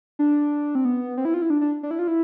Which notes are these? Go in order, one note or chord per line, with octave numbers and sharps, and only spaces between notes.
D4
C4
B3
C4
E4
F4
E4
D4
D4
D4
E4
F4
E4